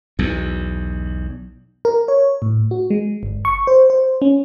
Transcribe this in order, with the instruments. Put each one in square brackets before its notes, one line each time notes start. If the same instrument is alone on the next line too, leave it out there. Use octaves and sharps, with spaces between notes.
[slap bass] B1 E2
[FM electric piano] A#4
C#5
A2
F#4
G#3
G1
C#6
C5
C5
C#4